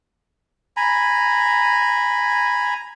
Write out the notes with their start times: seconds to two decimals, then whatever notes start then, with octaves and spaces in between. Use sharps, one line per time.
0.77 G#5 A#5 B5